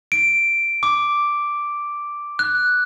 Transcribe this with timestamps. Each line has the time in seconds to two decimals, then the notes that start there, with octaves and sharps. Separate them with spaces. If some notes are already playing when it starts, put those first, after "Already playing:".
0.12 D7
0.83 D6
2.39 F#6